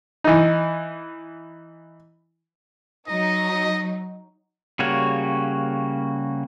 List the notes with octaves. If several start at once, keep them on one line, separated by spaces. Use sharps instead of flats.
E3 D#4
F#3 D#4 D#5
C#3 G3 A#3 F#4 C#5